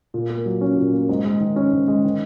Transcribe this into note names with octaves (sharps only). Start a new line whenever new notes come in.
A#2
A#3
F#3
C#4
A#2
A#3
G#2
G#3
D#3
C#4
G#2
G#3
D#3